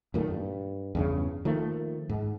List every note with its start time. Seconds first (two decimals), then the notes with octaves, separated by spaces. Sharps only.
0.14 F#2 A#2 D#3 A3
0.30 G2
0.95 E2 G2 C#3
1.45 D#3 F3 A3 A#3
2.09 G#2